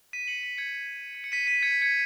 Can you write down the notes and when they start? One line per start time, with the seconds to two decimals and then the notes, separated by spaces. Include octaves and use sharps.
0.13 B6 D#7
0.28 C#7 F#7
0.43 B6 D#7
0.58 G#6 C#7
1.15 B6
1.24 C#7
1.32 B6 D#7
1.47 B6 D#7
1.62 G#6 C#7
1.72 B6
1.81 G#6 C#7